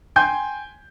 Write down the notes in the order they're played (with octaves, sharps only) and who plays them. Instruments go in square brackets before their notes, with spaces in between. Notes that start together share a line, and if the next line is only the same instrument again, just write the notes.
[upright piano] G5 G#5 C6 G6